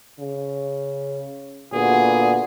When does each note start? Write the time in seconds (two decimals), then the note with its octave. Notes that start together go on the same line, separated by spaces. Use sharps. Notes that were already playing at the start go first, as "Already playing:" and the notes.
0.20 C#3
1.73 A#2 D3 B3 F#4 G#4